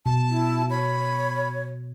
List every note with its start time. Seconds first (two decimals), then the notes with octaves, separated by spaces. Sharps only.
0.06 B2 A5
0.29 E4
0.70 C#5 B5